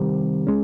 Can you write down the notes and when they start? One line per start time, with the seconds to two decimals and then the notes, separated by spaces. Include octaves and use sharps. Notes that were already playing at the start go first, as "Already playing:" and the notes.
Already playing: C3 D#3 G3 C4
0.47 G#3 C#4